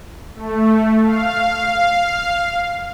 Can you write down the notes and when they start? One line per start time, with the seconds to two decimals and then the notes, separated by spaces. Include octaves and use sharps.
0.35 A3
1.03 F5